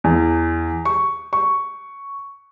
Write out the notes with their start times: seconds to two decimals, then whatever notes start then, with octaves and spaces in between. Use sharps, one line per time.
0.04 E2
0.85 C#6
1.33 C#6